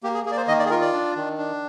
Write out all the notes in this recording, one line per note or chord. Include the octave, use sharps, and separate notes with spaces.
A#3 G4
G#4
A#3 G#4
D5
C5
D#3 D#5
D5
G#4
F4 A#4
D5
D4
D#3
D4